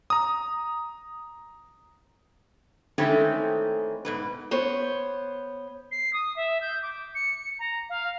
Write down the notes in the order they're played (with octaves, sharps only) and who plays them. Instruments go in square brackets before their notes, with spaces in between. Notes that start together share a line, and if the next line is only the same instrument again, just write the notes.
[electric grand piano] A#5 D#6
[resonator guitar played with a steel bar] D#3 E3 G#3 A3 C4 C#4
G#2 B2 B4
[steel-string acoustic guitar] B3 C5 C#5
[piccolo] C7
D#6
E5
G6
D6
C#7
A#5
F5